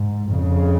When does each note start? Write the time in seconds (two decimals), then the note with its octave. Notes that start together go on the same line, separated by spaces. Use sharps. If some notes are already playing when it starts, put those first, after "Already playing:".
Already playing: G#2
0.32 F2 C#3